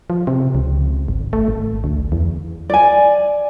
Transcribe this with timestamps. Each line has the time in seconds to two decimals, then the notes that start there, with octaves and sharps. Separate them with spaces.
0.10 F3
0.27 C3
0.55 C#2
1.08 G#1
1.33 A3
1.48 G#1
1.84 D2
2.12 E2
2.70 D5 G#5